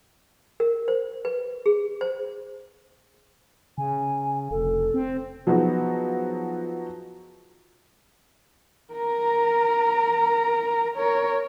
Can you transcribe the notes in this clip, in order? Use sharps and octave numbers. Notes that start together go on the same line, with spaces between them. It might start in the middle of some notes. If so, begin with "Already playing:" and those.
A#4
C5
B4
G#4
C5
C#3 G#5
F1 A4
C4
F3 F#3 B3 D#4 F#4 G#4
A#4 A#5
A#4 C#5